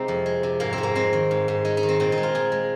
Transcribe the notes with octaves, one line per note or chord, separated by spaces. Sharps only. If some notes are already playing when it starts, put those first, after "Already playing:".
Already playing: C3 G#3 C4 D#4
F2
G#3
C3
G#2 A#3
C4
G#2
A#3
G#3 C4
D#3
G#2
G#2
G#3 D#4
D#4
D#3
C4
A#2 C4
D#4
G#3
F4
A#2 G#4
G#3